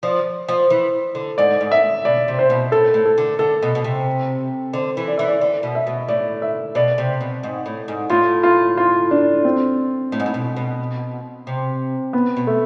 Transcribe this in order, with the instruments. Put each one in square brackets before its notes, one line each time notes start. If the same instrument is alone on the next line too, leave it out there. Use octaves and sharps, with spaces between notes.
[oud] F3 [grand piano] D5
[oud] F3
E3
D3
[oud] G#2 [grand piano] D5
[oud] G#2
[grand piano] E5
[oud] B2 [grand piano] D5
[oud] C3
[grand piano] C5
[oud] B2
[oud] A2 [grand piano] A4
[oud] A2
[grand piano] A4
[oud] D3
[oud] D3 [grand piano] A4
[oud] B2
B2
C3
[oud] D3 [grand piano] C5
[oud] E3
[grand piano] D5
[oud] E3 [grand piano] E5
[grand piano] D5
[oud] D3 [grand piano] D5
[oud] B2
[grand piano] E5
[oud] B2
[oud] A2 [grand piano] D5
[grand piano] E5
[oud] B2 [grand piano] D5
[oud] C3
B2
G#2
A2
G#2
[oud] A2 [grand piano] F4
[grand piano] F4
F4
D4
C4
[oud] A2
G#2
A2
B2
B2
C3
[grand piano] B3
[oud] B2
[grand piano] A3